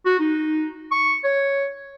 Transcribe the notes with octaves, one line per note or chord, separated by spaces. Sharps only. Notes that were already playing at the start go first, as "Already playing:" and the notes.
F#4
D#4
C#6
C#5